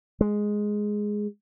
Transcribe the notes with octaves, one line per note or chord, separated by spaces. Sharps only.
G#3